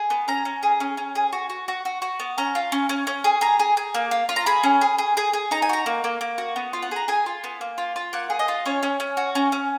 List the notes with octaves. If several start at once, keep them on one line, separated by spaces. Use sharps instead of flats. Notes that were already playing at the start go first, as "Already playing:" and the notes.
Already playing: G#4
B3
C#4 A#5
C#4
G#4
C#4
C#4
G#4
F#4
F#4
F#4
F#4
F#4
B3
C#4 A#5
F4
C#4
C#4
C#4
G#4
G#4 A#5
G#4
G#4
A#3
F4
F4
A#5
G#4 B5
C#4
G#4
G#4
G#4
G#4
D#4 A#5
G#5
F#4 A#5
A#3
A#3
A#3
F#4
B3
F4
F#5
G#4 A#5
G#4 G#5
F4
B3
A#3
F4
F4
A#3 F#5
G#4
D#5
F4
C#4 C#5
C#4
C#4
F#4
C#4
C#4